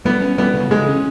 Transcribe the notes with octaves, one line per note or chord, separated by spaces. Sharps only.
G3 B3
C#4
G3 B3
C#3
C#3 G#3
C#4